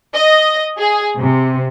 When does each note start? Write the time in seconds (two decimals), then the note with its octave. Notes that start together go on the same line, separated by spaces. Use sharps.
0.14 D#5
0.80 G#4
1.17 C3